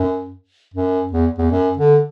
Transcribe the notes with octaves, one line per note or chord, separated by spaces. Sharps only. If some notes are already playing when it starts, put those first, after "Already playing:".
Already playing: F#2
F#2
E2
E2
F#2
D3